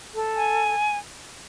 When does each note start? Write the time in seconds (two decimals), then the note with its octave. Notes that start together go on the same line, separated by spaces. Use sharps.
0.12 A4
0.37 G#5